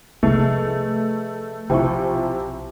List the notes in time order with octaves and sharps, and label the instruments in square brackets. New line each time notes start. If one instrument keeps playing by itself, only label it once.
[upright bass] C3 F3 [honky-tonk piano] A3 [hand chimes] G#4 B4 D#5
[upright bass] B1 [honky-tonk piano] C3 F3 E4 [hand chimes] G5 G#5 C#6